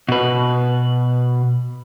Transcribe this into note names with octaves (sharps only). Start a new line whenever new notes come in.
B2 B4